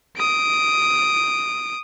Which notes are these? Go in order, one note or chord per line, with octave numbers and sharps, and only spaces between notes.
D#6 D7